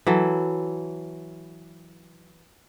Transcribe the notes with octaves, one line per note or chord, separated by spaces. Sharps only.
E3 F#3 A4